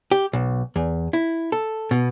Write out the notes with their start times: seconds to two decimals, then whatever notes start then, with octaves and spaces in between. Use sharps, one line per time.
0.12 G4
0.33 B1
0.76 E2
1.13 E4
1.52 A4
1.91 B2